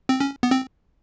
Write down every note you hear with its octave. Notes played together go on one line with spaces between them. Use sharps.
C4
C#4
B3
C4